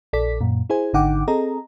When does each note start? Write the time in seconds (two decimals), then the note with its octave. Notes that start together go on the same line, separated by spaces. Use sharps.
0.13 A#1 A4 D5 B6
0.41 F#2 A#2
0.70 E4 G#4 C5 G#5
0.93 G#1 D3 D#4 F#5 G5 D6
1.28 C4 G#4 A4 D#5 A#5